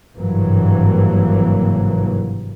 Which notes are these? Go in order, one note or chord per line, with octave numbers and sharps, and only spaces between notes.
G#1 G2 C3 E3 F#3 A#3